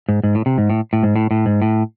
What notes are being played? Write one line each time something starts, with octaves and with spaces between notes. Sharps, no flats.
G#2
G#2
A2
C3
G#2
A2
A2
G#2
A2
A2
G#2
A2